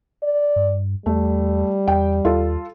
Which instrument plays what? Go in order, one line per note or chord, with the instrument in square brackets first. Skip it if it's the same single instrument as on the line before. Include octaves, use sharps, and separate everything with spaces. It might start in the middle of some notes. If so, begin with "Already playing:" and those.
[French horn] D5
[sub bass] G2
[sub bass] E2 [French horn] G3 [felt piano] A3
[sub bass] E2 [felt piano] G5
[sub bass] D#2 [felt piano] F4 A4